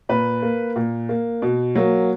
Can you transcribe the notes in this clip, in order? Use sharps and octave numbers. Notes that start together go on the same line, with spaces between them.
A#2 B4
A#3
A#2
A#3
B2
F#3 A#3